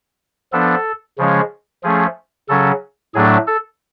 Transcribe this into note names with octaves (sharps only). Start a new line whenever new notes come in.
F3 B3 D4 A4
C#3 F3 G#3 C#4
F3 A3 C#4 G#4
C#3 F#3 C#4 A4
A2 F#3 A3 D4 G#4
A4